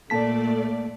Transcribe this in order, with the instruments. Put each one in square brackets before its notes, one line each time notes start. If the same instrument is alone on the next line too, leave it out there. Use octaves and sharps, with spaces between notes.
[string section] A#2 A3 D5 [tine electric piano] A#3 A5 B6